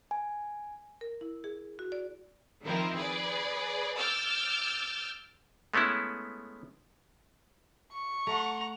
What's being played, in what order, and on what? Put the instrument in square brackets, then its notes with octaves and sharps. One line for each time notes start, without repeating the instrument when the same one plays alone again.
[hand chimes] G#5
[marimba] A#4
E4
G#4
F#4
D5
[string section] D#3 F3 C4 E4 F4 A#4
G#4 B4 D5
D6 E6 F6 G6 A6
[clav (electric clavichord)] G#3 A3 B3 C#4 E4
[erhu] C#6
[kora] A3 [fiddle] F#5 A#5